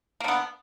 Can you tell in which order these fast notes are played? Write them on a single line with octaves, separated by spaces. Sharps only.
A#3 D3 B3